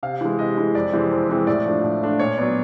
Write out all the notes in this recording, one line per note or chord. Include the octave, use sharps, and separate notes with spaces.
C3 F5
E3 G#3
C3 D#5
E3 G#3
F2 D5
C3 E3 G#3 C4
F2
C3 E3 G#3 C4
A2 D5
F3 A3 D4 F4
A2
F3 A3 D4 F4
A#2 C#5
F#3 B3 D5